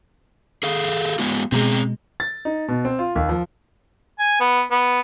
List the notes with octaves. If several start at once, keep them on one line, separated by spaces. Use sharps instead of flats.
G#4 A4 F5
G#3 B3 F4
B2 G#3 C4 G#4 A#5
A6
D#4
B2
C4
F4
D#2
F3
G#5
B3
B3